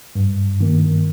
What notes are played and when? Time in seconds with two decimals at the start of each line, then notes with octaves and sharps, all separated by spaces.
0.15 G2
0.60 D#3 A#3